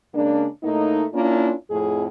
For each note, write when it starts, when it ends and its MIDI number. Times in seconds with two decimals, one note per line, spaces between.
0.15 0.47 49
0.15 0.47 56
0.15 0.47 58
0.15 0.47 62
0.63 1.05 45
0.63 1.05 57
0.63 1.05 58
0.63 1.05 63
1.14 1.53 58
1.14 1.53 61
1.14 1.53 62
1.14 1.53 64
1.14 1.53 65
1.70 2.08 41
1.70 2.08 45
1.70 2.08 68